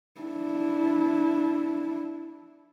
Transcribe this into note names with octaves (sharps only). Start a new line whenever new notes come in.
D4 E4